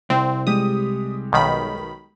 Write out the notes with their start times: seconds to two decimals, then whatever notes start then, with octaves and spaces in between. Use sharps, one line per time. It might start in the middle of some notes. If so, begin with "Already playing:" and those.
0.10 C2 C4
0.47 G3 G#3 G4 D#6
1.32 B1 D#3 B5